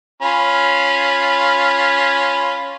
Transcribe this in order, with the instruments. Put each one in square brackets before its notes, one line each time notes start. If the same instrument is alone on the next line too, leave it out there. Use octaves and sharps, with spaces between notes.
[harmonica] C#4 F4 B5